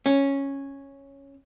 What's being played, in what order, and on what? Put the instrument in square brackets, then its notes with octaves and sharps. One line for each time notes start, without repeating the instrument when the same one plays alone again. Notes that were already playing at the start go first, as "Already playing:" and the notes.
[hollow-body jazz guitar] C#4